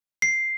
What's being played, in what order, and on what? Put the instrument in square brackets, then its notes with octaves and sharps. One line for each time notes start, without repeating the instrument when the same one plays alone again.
[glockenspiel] C7